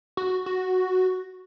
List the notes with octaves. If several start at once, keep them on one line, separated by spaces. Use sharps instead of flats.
F#4
F#4